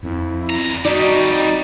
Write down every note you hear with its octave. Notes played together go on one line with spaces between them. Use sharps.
F2 E4
E2 A#5
F2 G3 D#4 F#4 D5